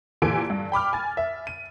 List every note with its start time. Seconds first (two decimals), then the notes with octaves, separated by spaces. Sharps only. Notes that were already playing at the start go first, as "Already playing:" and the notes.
0.22 A#2 E3 G4 A4 G#5 D7
0.50 G2
0.72 G5 B5 D6 F6
0.93 G#5 A6
1.17 E5
1.47 D#7